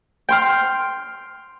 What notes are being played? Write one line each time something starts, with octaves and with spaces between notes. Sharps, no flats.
G5 C6 F6